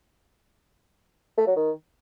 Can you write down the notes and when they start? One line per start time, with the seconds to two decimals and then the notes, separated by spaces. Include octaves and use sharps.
1.37 A3
1.47 F#3
1.56 D#3